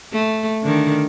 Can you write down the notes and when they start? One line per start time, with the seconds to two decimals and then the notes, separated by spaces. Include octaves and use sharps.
0.13 A3
0.63 D3 D#3